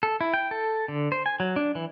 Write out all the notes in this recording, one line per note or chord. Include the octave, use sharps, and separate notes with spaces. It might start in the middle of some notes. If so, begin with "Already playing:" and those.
A4
E4
G5
A4
D3
C5
G#5
F#3
D4
E3